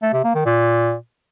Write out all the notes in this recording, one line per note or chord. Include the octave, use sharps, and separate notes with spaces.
A3
C3
A#3
D#3
A#2